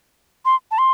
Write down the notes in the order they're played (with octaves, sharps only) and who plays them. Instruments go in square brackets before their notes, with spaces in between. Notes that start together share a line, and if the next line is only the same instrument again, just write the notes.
[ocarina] C6
A5
C6